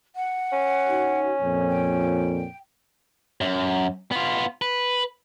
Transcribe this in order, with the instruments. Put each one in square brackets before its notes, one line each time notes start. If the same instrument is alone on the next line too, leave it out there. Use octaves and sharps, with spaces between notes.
[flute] F#5
[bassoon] C#4
[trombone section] D#4 F#4
F2 A#2
[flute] G5
[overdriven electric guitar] F#2
B3 F4
B4